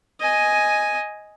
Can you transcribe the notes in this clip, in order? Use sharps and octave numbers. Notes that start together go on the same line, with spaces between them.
D#5 G#5